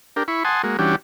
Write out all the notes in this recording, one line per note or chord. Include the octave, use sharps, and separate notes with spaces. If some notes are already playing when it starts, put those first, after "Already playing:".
D4 G4 A#4
E4 B5 C#6
F#5 G#5 A5 C6 D#6
G#3 A#3 F#4
E3 G3 C#4 D4 F#4 G4